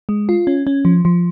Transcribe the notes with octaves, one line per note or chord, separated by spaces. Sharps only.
G#3
F4
C#4
C#4
F3
F3